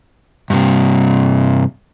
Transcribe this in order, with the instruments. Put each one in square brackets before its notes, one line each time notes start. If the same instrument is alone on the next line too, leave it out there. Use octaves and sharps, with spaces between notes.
[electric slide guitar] G2 C3